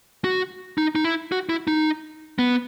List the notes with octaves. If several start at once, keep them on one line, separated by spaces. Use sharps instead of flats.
F#4
D#4
D#4
E4
F#4
E4
D#4
B3